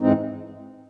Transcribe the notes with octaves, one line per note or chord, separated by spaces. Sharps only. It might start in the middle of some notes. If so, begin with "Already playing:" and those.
G#2 E3 G#3 C4 D#4